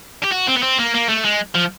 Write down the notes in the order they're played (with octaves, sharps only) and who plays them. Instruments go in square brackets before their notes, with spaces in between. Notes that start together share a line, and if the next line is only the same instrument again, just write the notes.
[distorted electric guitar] G4
F#4
C4
B3
C4
A#3
A#3
A3
G#3
F3